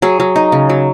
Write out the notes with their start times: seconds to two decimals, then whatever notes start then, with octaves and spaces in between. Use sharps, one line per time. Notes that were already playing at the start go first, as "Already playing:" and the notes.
0.02 F#3 G#4
0.20 F#3
0.36 D#4
0.52 C#3
0.69 F#3